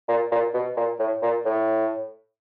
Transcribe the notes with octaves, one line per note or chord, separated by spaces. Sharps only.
A#2
A#2
B2
A#2
A2
A#2
A2